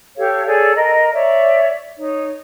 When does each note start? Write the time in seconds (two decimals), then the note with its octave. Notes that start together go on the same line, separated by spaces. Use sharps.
0.17 G4 A4 C#5 F5
0.46 G#4 A4 C#5 D5
0.75 A#4 D#5
1.13 C#5 D5 E5
1.97 D#4 C#5